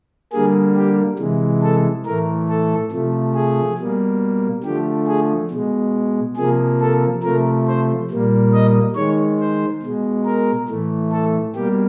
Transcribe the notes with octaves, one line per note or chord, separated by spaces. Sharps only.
D3 G3 A#3 G#4
G4
C3 E3 G#3
A4
A2 E3 A3 A#4
A4
C3 F3 A3
G#4
B2 G3 A#3
D3 F3 A3 G4
G#4
B2 G#3
C3 F3 A#3 G#4
A4
C3 F3 A3 A#4
C5
A#2 G3 A#3
D#5
D#3 G#3 C#5
C5
B2 G#3
A#4
A2 E3 A3
A4
B2 G3 A#3 G4